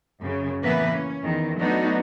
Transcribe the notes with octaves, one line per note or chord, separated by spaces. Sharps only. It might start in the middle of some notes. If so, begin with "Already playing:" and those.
F#2 C#3
A2 E3 A#3 B3 B4 E5
C#4
E2 D#3
F#3 A3 B3 D4 D#4 F#4